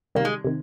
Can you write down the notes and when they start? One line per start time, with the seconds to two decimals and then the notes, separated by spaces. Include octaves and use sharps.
0.15 C3 D#3 G3 A#3
0.25 G#3
0.44 C3 D#3